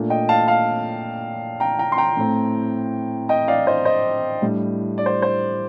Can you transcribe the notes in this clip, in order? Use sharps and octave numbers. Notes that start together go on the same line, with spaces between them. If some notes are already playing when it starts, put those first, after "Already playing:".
Already playing: A#2 A3 D4
D#5 G5
F5 A5
F5 A5
G5 A#5
G5 A#5
C6
G5 A#5
A2 A3 C4
D#5 G5
D5 F5
C5 D#5
C5 D#5
A2 G3 D4
D5
C5
C5